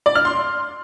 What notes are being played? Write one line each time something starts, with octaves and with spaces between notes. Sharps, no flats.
D5
F6
C6